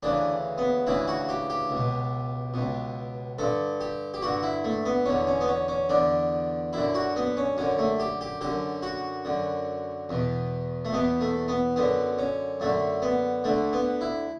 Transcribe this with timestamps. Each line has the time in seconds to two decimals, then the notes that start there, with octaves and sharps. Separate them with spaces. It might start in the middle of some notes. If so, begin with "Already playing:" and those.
0.03 D2 C#3 E3 D4
0.58 B3
0.87 D2 C#3 E3 E4
1.08 F#4
1.29 G4
1.50 G4
1.70 C#2
1.75 B2
2.54 C#2 B2
3.39 G2 D3 A4
3.80 G4
4.14 G4
4.22 G2 D3 F#4
4.43 E4
4.64 A3
4.85 B3
5.06 E2 D3 C#4
5.27 C#4
5.41 B3
5.48 C#4
5.68 C#4
5.89 E2 D3 D4
6.73 F#2 D3 E4
6.95 F#4
7.16 B3
7.37 C#4
7.57 F#2 D3 C#4
7.78 A3
8.00 G4
8.21 G4
8.41 F#2 D3 G4
8.83 F#4
9.25 F#2 D3
10.09 E2 B2
10.85 A3
10.93 E2 B2 B3
11.21 A3
11.48 B3
11.76 F#2 D3 B3
12.19 C#4
12.60 F#2 D3 A3
13.02 B3
13.44 D2 D3 A3
13.73 B3
14.01 E4